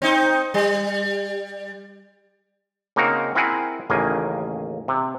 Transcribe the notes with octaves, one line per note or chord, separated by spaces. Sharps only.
C4 D#4
G3
C#3 A#3 C4 D#4 F#4 A#4
C4 E4 G#4 A#4 F#5 G#5
A1 D#2 C#3 A#3 G#5
C3